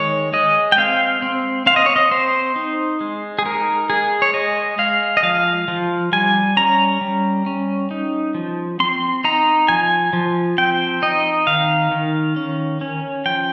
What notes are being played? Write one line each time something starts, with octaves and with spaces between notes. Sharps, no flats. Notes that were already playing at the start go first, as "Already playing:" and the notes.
Already playing: D#3 G#3 C#5
G#3 D#5
G5
C4 F5
C4
C4 F5
D#5
C#5
D#5
C4 C5
D#4
G#3
G#4
D#4 A#4
G#3 G#4
C#5
G#3 D#5
G#3 F5
D#5
F3 F5
F3
G3 G#5
C#4 A#5
G3
C#4
D#4
F3
C4 C6
D#4 A#5
F3 G#5
F3
C4 G5
D#4 D#5
D#3 F5
D#3
C#4
C#4
F3 G5